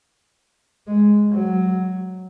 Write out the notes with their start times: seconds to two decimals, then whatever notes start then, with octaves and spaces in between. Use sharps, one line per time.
0.87 G#3
1.32 F#3